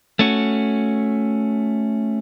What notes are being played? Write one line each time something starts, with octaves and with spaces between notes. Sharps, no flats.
A3 C#4 F#4